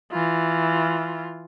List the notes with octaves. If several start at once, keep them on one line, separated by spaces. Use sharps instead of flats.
E3 F4